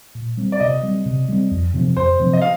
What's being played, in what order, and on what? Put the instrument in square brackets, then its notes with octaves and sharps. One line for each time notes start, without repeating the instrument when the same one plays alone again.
[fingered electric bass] A#2
G3 C4
[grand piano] D5
[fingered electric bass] C3 [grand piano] D#5
[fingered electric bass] G3 C4
C3
G3 C4
F2
C3 F3 C4
[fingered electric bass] F2 [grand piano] C5
[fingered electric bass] C3 F3 C4
[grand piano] D#5
F5